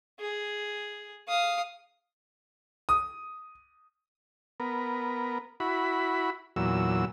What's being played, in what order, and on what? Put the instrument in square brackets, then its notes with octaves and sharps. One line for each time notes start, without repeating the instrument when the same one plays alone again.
[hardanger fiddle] G#4
F5 D#6
[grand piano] D#6
[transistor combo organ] B3 A#4
E4 F#4 B5
E2 A#2 F#3 E6